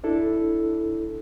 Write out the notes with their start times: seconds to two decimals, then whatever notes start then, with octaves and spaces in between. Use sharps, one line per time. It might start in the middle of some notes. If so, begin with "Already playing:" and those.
0.04 D4 E4 A4